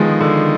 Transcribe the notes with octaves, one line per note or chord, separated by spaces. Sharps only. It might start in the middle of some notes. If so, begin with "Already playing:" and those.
Already playing: D3 D#3 F3 G#3 B3
D3